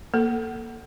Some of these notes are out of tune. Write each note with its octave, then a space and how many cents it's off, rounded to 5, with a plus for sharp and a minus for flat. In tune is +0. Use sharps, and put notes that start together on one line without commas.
A#3 +0 A4 +5